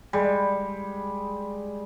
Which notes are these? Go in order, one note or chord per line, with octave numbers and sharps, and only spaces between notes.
G3 G#3